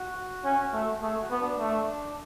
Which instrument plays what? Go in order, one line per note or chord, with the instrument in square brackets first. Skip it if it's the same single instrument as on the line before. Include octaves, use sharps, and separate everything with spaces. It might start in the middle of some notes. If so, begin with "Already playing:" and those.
Already playing: [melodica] F#4
[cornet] C#4
A3
[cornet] A3 [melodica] G#4
[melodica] F#4
[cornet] B3
[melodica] D4
[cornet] A3